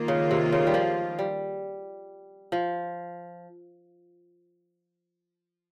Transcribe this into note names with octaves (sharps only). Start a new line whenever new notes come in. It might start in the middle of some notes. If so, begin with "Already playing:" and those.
Already playing: D#3 A#3 F4
C#3
C3
C#3
G3
F3
G3
F3